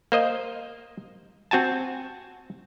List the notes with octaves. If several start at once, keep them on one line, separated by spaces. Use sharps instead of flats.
A#3 C5 D#5
C4 F#4 G#5 A5